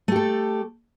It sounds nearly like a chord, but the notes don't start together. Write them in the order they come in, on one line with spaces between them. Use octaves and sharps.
A3 G4 A4